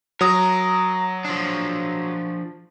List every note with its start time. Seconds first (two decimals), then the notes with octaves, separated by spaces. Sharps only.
0.21 F#3 A#4 D#6
1.25 F3 D4